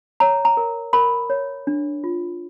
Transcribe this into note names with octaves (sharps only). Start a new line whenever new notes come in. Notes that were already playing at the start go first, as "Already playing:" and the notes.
C#5 A#5
A#5
A#4
A#4 B5
C#5
D4
F4